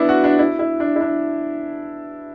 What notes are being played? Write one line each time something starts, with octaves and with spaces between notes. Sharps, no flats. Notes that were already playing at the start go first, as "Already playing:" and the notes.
Already playing: B3 D4 E4
F#4
D4
E4
E4
D4
E4
D4